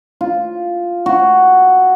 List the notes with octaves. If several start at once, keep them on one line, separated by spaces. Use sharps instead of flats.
F4
F#4